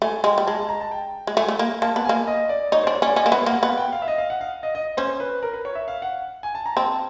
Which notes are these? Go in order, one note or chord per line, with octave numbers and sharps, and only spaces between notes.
A3 G#5
G#3 G5
G3
G#3 A5
A5
A#5
A5
G5
G#3
A3 G#5
A3
A#3
A#3 A5
B3
A#3 G#5
D#5
D5
D#4 C#5
C5
D4
C#5
C#4 D5
C#4 D#5
A#3
E5
B3
F5
A#3 F#5
B3 F#5
G5
F5
E5
D#5
F5
F#5
F5
D#5
D#5
C#4 C5
B4
A#4
B4
C#5
E5
F5
F#5
G#5
A5
A#5
C4 A5